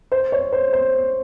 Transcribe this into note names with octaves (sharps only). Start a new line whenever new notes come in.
C5
C#5
C5
C5